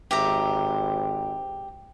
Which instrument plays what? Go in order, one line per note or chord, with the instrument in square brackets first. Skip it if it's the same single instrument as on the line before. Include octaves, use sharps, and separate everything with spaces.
[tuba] G#1 [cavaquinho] G4 E5 A#5